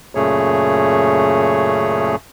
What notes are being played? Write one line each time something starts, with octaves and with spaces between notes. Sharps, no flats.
F#2 A#2 C#3 A3 G#4 C#5